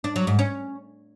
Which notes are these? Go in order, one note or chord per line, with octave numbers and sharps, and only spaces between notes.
D4
F#3
G#2
C#4